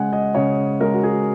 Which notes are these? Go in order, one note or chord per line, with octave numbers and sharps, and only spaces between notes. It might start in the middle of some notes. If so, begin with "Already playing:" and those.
Already playing: C#3 G#3 F#5 G#5
D#5
C#3 C#5
G#3 A#4
F#4
G#4